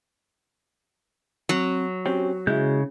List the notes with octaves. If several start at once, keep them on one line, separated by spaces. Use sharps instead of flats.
F#3 C4
C4 C#4 F#4 G4
C#3 G#3 E4 G6